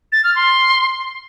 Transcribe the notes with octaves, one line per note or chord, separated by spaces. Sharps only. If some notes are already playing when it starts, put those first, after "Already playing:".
A6
F6
C6